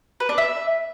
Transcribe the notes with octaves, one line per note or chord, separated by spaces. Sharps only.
B4
D4
E5